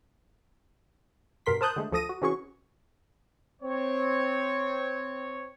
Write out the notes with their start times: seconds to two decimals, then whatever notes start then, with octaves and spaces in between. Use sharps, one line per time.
1.46 G2 B2 A#4 C6 B6
1.61 A#4 C5 A5 D#6 F#6 G6
1.76 D3 G#3 A3
1.92 D2 F3 A4 D#6 A#6 D#7
2.09 F#4
2.21 C3 E3 C#4 F#4 G#4 C#6
3.62 C4 C#5